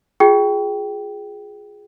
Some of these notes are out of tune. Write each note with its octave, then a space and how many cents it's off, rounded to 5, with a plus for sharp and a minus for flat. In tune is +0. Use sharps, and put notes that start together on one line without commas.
F4 +25 G#4 +0 G5 -10